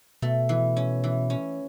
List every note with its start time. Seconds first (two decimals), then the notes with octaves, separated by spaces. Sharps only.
0.22 B2 A3
0.49 E3
0.77 C#4
1.04 E3
1.30 C#4